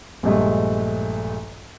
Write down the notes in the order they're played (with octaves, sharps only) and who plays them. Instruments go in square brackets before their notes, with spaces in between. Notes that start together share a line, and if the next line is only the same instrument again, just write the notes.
[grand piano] A#1 G2 G#3 A3